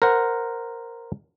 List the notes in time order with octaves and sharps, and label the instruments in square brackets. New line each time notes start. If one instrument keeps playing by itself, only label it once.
[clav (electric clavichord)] A#4 C5 F#5